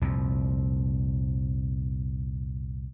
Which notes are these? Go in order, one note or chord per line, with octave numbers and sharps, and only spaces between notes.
C2 F2 A#2